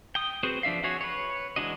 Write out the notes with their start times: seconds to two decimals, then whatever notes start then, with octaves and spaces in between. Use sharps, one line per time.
0.15 G5 D#6
0.43 C4 F#4 G#4 B4 C5
0.63 F3 D4 E5 F5
0.84 F#4 G#4 C#5
1.01 B4 C#5
1.56 E3 G#3 D4 F#4 D#5